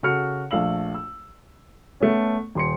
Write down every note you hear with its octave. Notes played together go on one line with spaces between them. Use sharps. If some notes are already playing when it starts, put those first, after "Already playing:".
C#3 F#4 A4 F6 C#7
A#1 A3 F5 E6 F#7
E6
A3 B3 C#4
D#1 C6 C#7